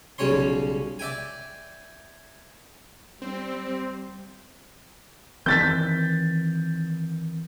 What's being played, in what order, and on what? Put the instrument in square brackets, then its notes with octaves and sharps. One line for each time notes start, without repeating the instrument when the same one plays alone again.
[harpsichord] B1 C#3 G3 C#4 C#5 C6
D5 E5 G5 G#5
[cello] G3 [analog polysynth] C4
[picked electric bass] D#3 E3 C4 [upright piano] G6 A6 B6